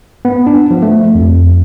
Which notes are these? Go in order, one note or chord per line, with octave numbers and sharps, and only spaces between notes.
B3
D4
F3
A3
F2